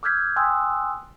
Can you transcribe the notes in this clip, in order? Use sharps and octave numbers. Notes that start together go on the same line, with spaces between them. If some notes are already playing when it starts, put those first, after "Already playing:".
D6 E6 F6 G6 G#6 B6
G5 G#5 C6 D#6 E6 F#6